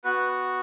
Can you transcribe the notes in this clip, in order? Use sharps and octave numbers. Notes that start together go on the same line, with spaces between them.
B3 F#4 B4